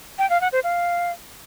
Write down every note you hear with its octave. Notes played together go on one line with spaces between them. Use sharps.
G5
F5
F#5
C5
F5